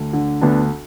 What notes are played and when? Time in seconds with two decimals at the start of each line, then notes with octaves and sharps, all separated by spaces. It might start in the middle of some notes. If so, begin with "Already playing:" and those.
Already playing: D2
0.13 D3
0.41 D2 B3 D4